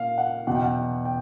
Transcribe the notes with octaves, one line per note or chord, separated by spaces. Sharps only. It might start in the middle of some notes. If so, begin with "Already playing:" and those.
Already playing: A#2 F5
F#5
E2 B2 F#3 F#5
G5
F#5
G5